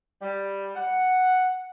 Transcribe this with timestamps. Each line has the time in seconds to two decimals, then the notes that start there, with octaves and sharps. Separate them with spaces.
0.22 G3
0.76 F#5